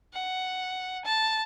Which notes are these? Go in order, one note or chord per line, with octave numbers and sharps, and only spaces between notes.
F#5
A5